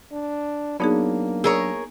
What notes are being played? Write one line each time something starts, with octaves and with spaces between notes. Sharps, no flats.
D4
F#3 A#3 B3 D4 D#4 G#4
G#4 A#4 C#5 D#6 E6